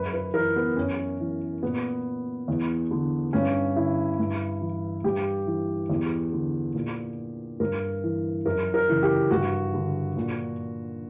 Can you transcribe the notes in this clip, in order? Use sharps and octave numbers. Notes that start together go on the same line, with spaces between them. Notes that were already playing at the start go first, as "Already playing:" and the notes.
Already playing: F#2 B4
B4
E3 A#4
B3
F#2 C#4
E3
A#2 B3
E2
D3
G2 C#4
D3 E4
G2
E3
G2 G4
E3
E2
D3
A#2
G2 A#4
E3
F#2 A#4
A#4
C#3 E3
G4
G2 F#4
D3
A#2